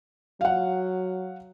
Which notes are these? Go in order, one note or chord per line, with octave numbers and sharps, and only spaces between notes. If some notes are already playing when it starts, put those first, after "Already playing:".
F#3 F5 F#5